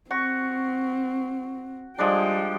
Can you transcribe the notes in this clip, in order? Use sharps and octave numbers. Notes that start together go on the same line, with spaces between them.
C4 F#4 C#6
F3 G3 G#3 D4 G5